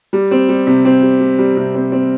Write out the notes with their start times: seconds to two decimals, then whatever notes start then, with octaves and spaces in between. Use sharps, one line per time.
0.13 G3
0.31 C4
0.49 G3
0.67 C3
0.85 C4
1.02 G3
1.20 G3
1.39 G3
1.57 C3
1.75 C4
1.92 C4